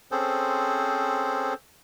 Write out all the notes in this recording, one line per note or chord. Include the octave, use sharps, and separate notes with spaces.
C4 C#4 G#4 A4 C5